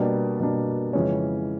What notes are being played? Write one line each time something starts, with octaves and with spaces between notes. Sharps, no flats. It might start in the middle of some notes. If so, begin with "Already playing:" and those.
Already playing: B2 G3 A#3 D4
B2 G3 A#3 D4
F2 C#3 E3 G#3 C#4